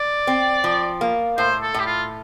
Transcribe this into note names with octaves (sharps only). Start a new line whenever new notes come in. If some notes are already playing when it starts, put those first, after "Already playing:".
Already playing: D5
C4
F3
A#3
A2 C5
A4
A2 G4
F4